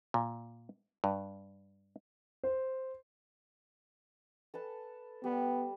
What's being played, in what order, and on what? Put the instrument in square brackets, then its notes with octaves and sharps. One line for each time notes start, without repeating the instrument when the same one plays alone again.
[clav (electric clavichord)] A#2
G2
[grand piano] C5
[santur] A4 B4 A5
[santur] G3 [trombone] B3